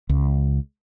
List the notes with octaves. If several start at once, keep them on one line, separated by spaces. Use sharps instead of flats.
C#2